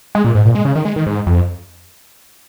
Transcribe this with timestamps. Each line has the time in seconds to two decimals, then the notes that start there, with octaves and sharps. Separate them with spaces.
0.15 G#3
0.24 A#2
0.35 G#2
0.45 A#2
0.55 G#3
0.65 C#3
0.75 D#3
0.85 G#3
0.96 D#3
1.06 G#2
1.27 F2